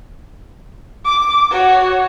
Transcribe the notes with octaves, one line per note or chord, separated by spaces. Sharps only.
D6
F#4 C#5